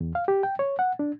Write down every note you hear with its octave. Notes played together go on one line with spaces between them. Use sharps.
E2
F5
G4
G5
C#5
F#5
D4